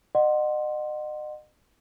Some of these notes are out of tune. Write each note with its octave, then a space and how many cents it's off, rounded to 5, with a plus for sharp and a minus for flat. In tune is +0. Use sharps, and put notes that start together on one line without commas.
D#5 -35 F#5 +0 C6 +0